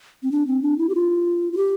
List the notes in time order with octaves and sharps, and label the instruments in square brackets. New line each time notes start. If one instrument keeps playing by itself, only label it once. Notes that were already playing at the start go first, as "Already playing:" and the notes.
[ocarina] C4
D4
C4
D4
E4
G4
F4
F4
G4